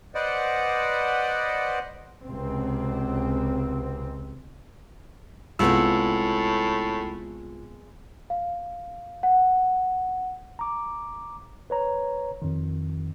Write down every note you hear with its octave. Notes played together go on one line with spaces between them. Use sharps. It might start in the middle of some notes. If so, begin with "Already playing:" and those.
B4 C5 D5 D#5 F#5
C#2 C3 C4
C2 A2 G#3 B3 C4 F4 E6
F5
F#5
A#5 D6
B4 C#5 A#5
F2 D#3